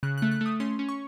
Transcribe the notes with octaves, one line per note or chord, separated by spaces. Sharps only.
C#3 F#6
A3 F#6
F#6
A3 D#6
C#4 C6
C#4
C#6